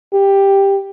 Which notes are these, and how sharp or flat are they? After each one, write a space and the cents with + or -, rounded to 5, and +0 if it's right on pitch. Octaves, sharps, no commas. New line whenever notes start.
G4 +5